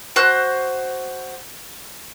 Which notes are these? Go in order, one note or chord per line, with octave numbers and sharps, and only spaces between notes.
F#4 C5 F#6